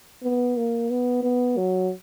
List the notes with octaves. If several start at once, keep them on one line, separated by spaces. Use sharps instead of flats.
B3
A#3
B3
B3
F#3